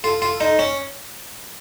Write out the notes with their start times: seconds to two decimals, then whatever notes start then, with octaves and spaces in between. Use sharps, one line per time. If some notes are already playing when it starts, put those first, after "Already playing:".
0.03 F4 A4
0.22 F4
0.41 D#4
0.59 C#4